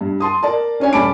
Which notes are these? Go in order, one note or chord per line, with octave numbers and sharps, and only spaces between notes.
G2
A5 C6 D#6
A#4 D5 A5
C#4 D4 C#5 G#5
D#1 C#4 A5 B5 D6 D7